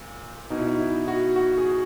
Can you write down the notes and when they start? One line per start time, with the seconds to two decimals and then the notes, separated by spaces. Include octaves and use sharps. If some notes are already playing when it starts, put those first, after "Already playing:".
Already playing: A#2
0.50 B2 D#4
0.59 E4
0.67 D#4
0.79 E4
1.08 F#4
1.36 F#4
1.58 G#4